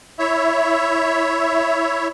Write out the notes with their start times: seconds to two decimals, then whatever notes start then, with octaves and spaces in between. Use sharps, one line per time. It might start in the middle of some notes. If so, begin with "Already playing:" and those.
0.19 E4 C#5 E5